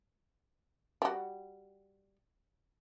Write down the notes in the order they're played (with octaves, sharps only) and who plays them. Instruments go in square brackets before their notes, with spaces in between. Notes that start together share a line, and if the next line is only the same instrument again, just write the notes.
[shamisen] G3 F#4